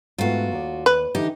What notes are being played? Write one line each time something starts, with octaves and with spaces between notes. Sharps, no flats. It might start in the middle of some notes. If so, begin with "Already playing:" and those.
G#2 A3 B3 F4 F#4
D#2 D5
B4
D3 E3 D#4 G4